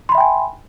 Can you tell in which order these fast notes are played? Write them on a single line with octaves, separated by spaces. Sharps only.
C6 B5 E5 G5 G#5